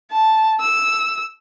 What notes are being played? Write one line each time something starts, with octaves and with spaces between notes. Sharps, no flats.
A5
E6